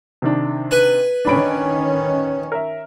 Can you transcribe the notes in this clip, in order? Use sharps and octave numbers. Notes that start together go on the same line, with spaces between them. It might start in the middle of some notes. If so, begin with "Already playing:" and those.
C3 D#3 D4
B4 G#5
D#3 C#4 D4 B5 D7
A#4 E5